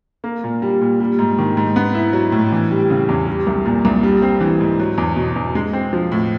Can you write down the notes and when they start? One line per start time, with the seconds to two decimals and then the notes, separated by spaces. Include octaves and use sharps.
0.24 A#3
0.44 A#2
0.62 G3
0.81 A#2
1.00 G3
1.19 G#2
1.39 D#3
1.57 G#2
1.76 B3
1.95 E4
2.13 F#3
2.32 A2
2.52 E3
2.71 G3
2.90 C#3
3.09 E2
3.27 G3
3.47 C2
3.66 A#2
3.85 C2
4.03 G3
4.22 C4
4.41 E3
4.61 G#2
4.80 F#3
4.98 E2
5.16 B2
5.36 E2
5.55 G#3
5.73 C4
5.93 F3
6.12 A2